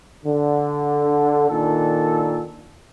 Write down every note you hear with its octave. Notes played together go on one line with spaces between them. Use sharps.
D3
A#2 D#3 D4 A4